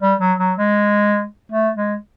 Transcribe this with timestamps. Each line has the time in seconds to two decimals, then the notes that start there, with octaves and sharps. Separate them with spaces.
0.02 G3
0.20 F#3
0.40 F#3
0.58 G#3
1.52 A3
1.77 G#3